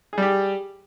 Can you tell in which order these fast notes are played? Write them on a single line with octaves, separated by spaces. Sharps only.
G#4 G3 G4